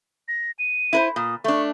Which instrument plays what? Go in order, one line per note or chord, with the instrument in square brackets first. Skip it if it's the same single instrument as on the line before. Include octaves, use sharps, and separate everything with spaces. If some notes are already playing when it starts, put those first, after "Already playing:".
[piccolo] A#6
D#7
[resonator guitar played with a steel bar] E4 B4 C5
[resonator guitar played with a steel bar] A#2 [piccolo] D#6
[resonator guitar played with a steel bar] A3 D4 [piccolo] C#6